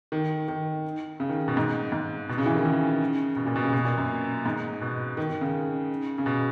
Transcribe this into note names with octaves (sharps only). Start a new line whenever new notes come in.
D#3
D#3
C#3
D#3
B2
G#2
G#2
B2
C#3
E3
D#3
C#3
B2
A#2
B2
C#3
B2
A#2
F#2
G#2
B2
D#3
D#3
C#3
C#3
B2